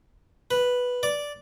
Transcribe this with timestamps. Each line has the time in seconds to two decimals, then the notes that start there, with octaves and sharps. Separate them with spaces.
0.51 B4
1.03 D5